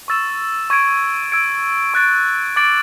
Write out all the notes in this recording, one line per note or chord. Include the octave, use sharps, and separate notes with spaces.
C#6 E6 A6 E7
C#6 G#6 D7
E6 G#6 D7
C#6 F#6 A6 D7
D6 A6 D7 F#7